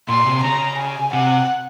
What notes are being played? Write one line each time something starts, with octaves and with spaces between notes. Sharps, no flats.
A#2 C6
C3
C#3 A#5
G#5
C3 F#5